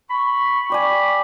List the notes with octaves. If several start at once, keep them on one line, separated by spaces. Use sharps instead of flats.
B5 C#6
G4 D5 G#5 B5